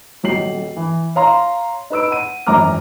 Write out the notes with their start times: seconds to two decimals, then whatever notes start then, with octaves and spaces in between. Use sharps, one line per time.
0.23 D#1 B1 F#4 C7 F#7
0.77 E3
1.16 C#5 F5 A#5 C6
1.90 D#4 B4 E6 D7
2.11 F#5 D#7
2.47 G#1 F#2 E3 A#5 D6 F6